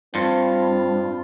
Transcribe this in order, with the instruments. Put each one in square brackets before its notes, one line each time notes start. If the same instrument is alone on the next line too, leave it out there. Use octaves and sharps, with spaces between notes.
[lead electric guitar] G2 [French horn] C4 [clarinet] F4